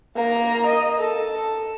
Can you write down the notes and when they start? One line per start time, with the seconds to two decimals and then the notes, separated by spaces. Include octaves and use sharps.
0.15 A#3 A#5
0.67 D#5
1.01 A4